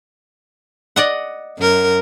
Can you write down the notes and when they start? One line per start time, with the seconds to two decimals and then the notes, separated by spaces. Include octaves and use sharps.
0.96 D5 D#5 F#5
1.58 F#2 A#4